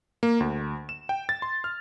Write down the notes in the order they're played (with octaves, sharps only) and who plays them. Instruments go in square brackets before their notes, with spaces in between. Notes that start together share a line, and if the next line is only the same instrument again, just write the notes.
[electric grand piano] A#3
D2
E7
G5
A6
C6
F6